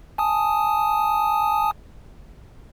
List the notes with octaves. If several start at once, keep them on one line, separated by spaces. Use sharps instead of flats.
G#5 A5 D#6